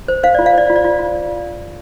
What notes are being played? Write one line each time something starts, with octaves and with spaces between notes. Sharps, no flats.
C5
C5 F5
F4 D5
F5
C5 D5
F4
D5
F4
F4